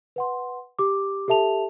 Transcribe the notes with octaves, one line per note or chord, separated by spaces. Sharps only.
B4 F#5 C6
G4 D6
G4 A4 E5 A5 F7